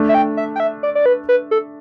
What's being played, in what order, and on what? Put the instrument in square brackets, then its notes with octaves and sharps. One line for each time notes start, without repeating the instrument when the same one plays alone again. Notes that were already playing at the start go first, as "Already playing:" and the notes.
Already playing: [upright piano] A3 D4
[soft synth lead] E5
G5
E5
G5
E5
D5
D5
B4
B4
A4